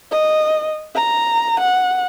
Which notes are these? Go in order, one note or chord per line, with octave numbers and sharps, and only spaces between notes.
D#5
A#5
F#5